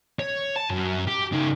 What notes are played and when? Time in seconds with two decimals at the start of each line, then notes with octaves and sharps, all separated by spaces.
0.19 C#5
0.56 A5
0.70 F#2
1.07 G4
1.32 C#3 D#4